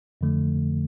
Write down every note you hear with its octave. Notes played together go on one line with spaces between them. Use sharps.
F2 D3 F3 A3